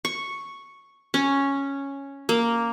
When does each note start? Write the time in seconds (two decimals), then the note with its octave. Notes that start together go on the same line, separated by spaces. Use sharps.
0.05 C#6
1.14 C#4
2.29 A#3